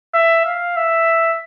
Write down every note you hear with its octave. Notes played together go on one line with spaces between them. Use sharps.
E5
F5
E5